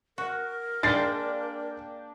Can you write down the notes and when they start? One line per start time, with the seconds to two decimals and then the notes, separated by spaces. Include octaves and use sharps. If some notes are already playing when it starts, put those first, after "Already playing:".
0.18 F#4 A#4
0.83 G#3 A#3 D4 G5 A6 C7